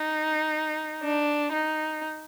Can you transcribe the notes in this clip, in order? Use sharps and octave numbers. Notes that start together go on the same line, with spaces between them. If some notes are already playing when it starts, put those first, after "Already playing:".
Already playing: D#4
D4
D#4